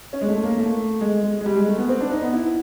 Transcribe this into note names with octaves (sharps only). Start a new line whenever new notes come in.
C#4
G#3
A3
A#3
A3
G#3
G#3
G#3
G3
G#3
A3
B3
C4
D4
D#4
B3
E4